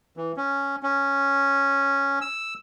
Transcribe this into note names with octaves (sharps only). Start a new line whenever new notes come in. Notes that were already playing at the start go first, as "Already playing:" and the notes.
E3
C#4
C#4
E6